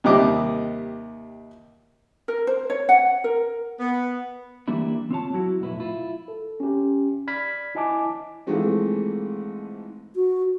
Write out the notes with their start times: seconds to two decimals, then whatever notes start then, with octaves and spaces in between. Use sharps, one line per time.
0.04 D#2 C3 G3 D#5 D6
2.28 A#4
2.47 C5
2.70 C#5
2.89 F#5
3.24 A#4
3.79 B3
4.68 E3 G3 A#3 D4 E4
5.11 C4 F4 C#5 A5
5.33 F#3 E4 F#4
5.60 B1 F2 A2 E4 B4
5.80 E4 F4
6.28 A4
6.60 C#4 G4
7.27 D5 B5 F6 G#6 B6
7.75 E4 D#5 G#5 A5 D6
8.47 G#2 E3 F3 G#3 A3 C4
10.15 F#4